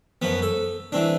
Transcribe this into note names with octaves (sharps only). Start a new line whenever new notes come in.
F#2 F3 B3
A4
E3 C4 D4